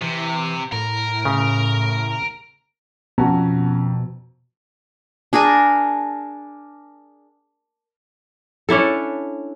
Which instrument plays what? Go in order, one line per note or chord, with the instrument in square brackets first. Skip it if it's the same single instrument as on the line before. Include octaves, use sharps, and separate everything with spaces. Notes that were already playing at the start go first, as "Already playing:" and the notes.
[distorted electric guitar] C3 [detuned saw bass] E3
[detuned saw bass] A2 [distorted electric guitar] A#4
[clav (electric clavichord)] C#3
[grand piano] F2 A5 A#5 [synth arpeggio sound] B2 [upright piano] C#4 F#4
[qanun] D4 G#4 A#4 G#5
[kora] C#4 D4 E4 A4